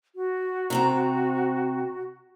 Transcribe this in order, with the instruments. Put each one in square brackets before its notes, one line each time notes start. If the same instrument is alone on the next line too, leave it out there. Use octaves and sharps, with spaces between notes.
[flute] F#4
[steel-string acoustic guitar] C3 C4 A#5